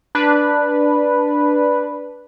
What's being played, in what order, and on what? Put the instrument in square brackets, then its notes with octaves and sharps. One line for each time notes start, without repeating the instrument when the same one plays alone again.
[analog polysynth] D4 B4